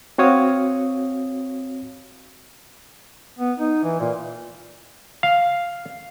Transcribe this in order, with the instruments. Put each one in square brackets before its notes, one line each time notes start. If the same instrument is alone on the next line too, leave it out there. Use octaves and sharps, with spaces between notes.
[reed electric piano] C4 F#4 C#5 F5 D#6
[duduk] B3
D#4
E3
A#2
[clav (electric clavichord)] F5